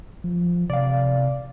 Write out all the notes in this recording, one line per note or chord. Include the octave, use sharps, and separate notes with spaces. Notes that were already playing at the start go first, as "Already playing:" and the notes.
F3
C3 D5 F5